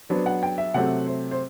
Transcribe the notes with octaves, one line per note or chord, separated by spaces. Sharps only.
F#3 B3 D4 C5
F#5
G5
E5
C3 F#3 A3 C4 F#5
C5
C5